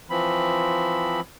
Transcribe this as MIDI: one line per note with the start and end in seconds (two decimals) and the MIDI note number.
0.10 1.20 52
0.10 1.20 53
0.10 1.20 60
0.10 1.20 83